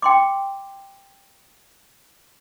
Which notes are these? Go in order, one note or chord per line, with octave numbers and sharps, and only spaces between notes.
G5 C6 D6